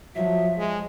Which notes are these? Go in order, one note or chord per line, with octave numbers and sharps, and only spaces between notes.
F3 F#3 E5
G#3